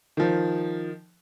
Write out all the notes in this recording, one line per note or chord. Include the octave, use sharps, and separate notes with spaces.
D#3 F3